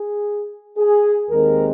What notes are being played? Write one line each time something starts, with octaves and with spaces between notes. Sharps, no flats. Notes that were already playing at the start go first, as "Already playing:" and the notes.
Already playing: G#4
G#4
D#2 D#3 G#3 C4 A#4